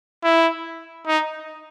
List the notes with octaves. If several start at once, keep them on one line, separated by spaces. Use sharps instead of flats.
E4
D#4